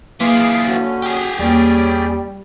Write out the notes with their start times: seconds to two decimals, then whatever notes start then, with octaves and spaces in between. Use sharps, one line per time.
0.21 E3 A#3 F4 G#4 F5 C6 D6
0.68 D3 C#4 F#4
1.02 G4 G#4
1.39 E2 G3 A#3 C#4 D5 G5